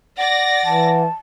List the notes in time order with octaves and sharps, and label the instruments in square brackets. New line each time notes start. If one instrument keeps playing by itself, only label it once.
[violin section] D5 A6 A#6 [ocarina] F#5
[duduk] E3 [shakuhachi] A5